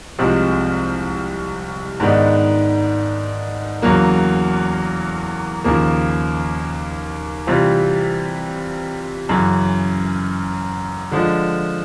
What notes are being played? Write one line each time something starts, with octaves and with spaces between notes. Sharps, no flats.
C2 C3 F3 G#3 C4
G#2 D#3 G#3 B3 D4
E2 C#3 F#3 A#3
D#2 C#3 F3 A#3
C3 E3 G3 C4 F4
F#2 C#3 E3
D3 F3 G#3